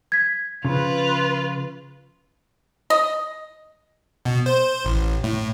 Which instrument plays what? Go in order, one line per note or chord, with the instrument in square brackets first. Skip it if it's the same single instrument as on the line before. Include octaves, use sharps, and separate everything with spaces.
[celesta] G#6 B6
[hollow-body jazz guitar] C#3 F3 [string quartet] F4 B4
[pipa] D#5
[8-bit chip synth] B2
C5
A1
A2